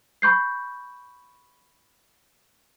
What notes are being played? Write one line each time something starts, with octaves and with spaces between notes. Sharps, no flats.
B5 C#6 G6 C7